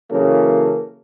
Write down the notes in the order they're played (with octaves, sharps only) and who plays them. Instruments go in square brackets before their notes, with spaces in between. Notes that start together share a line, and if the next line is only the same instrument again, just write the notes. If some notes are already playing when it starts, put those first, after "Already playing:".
[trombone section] C#3 E3 F#3 A#3 C#4 A4